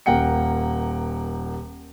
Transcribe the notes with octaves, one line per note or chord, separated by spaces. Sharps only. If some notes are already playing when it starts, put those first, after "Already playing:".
D#1 A#3 F#5 G5 C#7